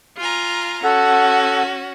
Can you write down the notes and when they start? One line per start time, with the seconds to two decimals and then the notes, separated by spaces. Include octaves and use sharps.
0.18 F4 G#5 A#5
0.83 C#4 F#4 A4 F#5